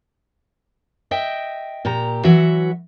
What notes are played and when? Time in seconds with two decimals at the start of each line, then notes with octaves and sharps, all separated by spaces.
1.11 D#5 E5 G5
1.85 A#2 G4 A#5
2.24 E3 F#3 F#4 E5